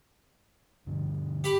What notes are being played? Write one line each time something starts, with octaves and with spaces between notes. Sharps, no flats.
G2 B2 D3
G4 B5 D6